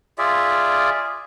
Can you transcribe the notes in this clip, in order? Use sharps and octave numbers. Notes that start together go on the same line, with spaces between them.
F4 G#4 D5 E5